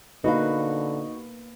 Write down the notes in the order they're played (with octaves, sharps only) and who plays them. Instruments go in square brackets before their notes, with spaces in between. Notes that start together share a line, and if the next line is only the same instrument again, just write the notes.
[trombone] D3 [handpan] A#3 B4 [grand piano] D#4 [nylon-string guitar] F#4 D#5 F5